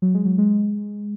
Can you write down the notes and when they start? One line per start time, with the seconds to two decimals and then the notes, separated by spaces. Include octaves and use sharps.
0.02 F#3
0.14 G#3
0.25 F#3
0.38 G#3